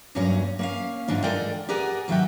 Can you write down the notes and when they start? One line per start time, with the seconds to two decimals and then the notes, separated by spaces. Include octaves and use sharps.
0.15 E2 G2 A#2 F#3 C#4 A#4
0.59 A#3 C#4 F5
1.08 G#2 D3 E3 D4 F4
1.24 G#3 F4 A4 A#4 D5 G5
1.69 G4 G#4 A#4 D5 F#5 G#5
2.08 G#2 D#3 F#3 E5 F#5 G5